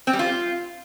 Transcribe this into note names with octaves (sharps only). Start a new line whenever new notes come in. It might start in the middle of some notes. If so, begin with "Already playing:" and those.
C4
G3
F4